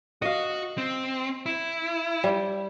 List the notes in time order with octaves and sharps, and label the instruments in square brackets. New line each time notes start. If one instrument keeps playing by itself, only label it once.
[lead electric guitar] F#4 [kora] D#5 F5
[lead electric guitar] C4
E4
[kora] G3